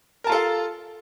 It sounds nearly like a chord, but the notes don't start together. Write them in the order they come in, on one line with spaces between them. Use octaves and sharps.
A#4 A5 F4 A4 F5